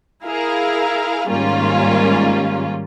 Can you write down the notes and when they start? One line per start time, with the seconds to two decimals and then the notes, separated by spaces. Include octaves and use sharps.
0.25 E4 G#4 A#4 F5
1.29 G#2 D#3 G3 A#3 C#4 F4